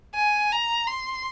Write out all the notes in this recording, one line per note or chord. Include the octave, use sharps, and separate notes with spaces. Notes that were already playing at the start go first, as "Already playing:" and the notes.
G#5
A#5
C6